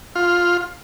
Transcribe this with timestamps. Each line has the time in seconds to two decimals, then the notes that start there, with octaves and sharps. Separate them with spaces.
0.15 F4